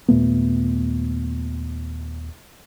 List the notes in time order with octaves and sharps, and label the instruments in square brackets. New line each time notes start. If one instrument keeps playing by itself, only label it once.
[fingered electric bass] D#2 A#2 A3 B3